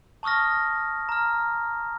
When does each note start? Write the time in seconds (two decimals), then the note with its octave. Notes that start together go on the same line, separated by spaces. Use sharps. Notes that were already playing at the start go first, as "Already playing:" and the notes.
0.23 A5 C#6 D#6 F6 A#6
1.09 A#5 F6